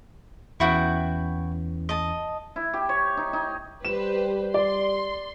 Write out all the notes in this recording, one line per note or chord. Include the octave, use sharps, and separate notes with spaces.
E2 E3 C#4 E4 F#4 G5
D#5 A5
E4
G4
C#5
D#4
D#4
G3 G4 B4 C5 E7
D5 C6